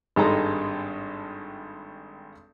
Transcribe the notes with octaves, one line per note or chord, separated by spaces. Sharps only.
G#1 G2 G#3 D#4 A4 A#5